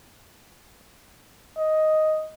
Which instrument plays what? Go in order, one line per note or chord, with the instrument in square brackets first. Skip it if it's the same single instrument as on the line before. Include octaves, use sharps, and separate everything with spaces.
[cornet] D#5